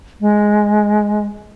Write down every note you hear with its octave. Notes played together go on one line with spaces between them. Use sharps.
G#3